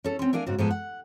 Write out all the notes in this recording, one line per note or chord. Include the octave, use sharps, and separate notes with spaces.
C#4 A4
C4 C#4
A3 D4 A#4 F5 G#5
G#2 C#3 F#4
G#2 F3 G#3 B3 A4 G#5
F#5